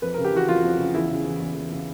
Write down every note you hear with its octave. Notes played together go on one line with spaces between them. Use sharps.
F2 B4
C#3 A#4
G4
E3 F#4
F2 F4
F2
C#3
E2 E4
C#3
E3
E2
E2
C#3